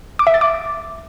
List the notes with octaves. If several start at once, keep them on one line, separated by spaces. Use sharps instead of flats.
D6
E5
A6
D6